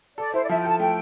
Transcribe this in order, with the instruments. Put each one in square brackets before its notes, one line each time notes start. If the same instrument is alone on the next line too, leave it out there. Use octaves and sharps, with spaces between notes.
[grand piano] A4 [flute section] D5
[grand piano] E4 [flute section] C5
[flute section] D5
[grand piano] F3 [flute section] E5
[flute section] G5
[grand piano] A4 [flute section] A5
[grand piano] A3 [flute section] G5